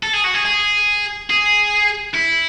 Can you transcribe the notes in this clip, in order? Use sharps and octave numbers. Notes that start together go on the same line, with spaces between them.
A4
G#4
F#4
G#4
G#4
G#4
E4